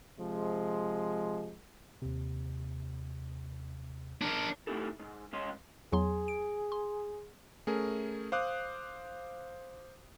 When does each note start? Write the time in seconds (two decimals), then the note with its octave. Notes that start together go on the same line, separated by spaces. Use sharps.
0.20 C3 F3 G#3
2.02 D#2 C3
4.21 D4 A#4
4.67 A3 B3 D#4 E4 G4 A4
4.99 G#2
5.32 C#2 C#3 G#3 C#5 D#5 C6
5.93 E2 F#3 G#4 C6
6.28 D7
6.72 C6
7.67 A3 C#4 G#4 A#4
8.32 C5 F5 D6 D#6 F#6